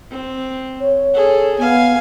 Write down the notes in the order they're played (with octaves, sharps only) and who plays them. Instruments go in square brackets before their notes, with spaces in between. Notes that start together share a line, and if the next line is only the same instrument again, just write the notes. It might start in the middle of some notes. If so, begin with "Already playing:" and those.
[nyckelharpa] C4
[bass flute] C#5
[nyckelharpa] G#4 A4
[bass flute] B3 [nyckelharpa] F5 G#5